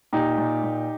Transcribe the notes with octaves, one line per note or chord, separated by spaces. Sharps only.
A#2 D#4 G4
A#2
A#2